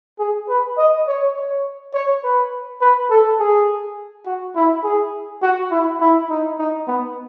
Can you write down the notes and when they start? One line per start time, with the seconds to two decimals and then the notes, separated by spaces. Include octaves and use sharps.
0.20 G#4
0.49 B4
0.78 D#5
1.08 C#5
1.36 C#5
1.94 C#5
2.24 B4
2.81 B4
3.10 A4
3.40 G#4
4.27 F#4
4.56 E4
4.84 G#4
5.43 F#4
5.71 E4
6.01 E4
6.30 D#4
6.59 D#4
6.88 B3